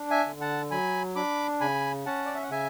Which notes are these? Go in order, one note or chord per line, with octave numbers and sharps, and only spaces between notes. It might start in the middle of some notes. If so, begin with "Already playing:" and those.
Already playing: D4
E5 G#5
D3
F#5 A5
F#3 G#5 B5
D4 B5 D6
C#3 G#5 B5
C#4 F#5 A5
D5
E5
F#5
C#3 E5 G#5